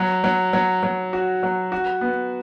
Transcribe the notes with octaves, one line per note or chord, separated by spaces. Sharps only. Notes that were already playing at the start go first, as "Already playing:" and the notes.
Already playing: F#3
F#3
F#3
F#3
F#4
F#3
F#4
B3